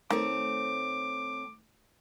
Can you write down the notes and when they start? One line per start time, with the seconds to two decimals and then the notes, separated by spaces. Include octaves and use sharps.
0.10 D#3 A3 C4 C#5 D6